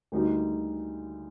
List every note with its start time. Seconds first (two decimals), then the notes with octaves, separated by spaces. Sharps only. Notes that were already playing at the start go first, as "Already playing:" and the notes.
0.12 D2 D3 G3 A#3 D#4